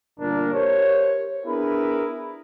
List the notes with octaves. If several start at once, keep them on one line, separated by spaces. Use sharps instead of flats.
G1 A#2 D4 A#4
G4 A#4 C5 C#5
B3 D4 E4 G#4 A#4 B4